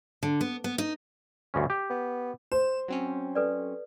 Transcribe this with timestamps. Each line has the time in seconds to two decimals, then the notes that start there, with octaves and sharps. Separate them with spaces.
0.23 D3
0.41 B3
0.64 B3
0.78 D#4
1.54 D2 G2 C#4
1.70 G4
1.90 B3
2.52 C5 E7
2.88 F#3 C4 C#4
3.35 A4 B4 D5